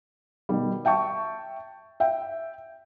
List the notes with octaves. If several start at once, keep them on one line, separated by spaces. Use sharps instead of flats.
B2 D#3 G3
E5 G5 A5 C#6
E5 G5